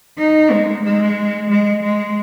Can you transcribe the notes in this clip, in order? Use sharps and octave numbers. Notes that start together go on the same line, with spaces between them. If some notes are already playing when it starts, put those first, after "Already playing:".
D#4
G#3
G#3
G#3
G#3